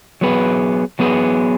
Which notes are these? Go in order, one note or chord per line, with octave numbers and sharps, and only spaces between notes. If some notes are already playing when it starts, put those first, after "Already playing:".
F#3 B3 G#4 B4
F#3 B3 G#4 B4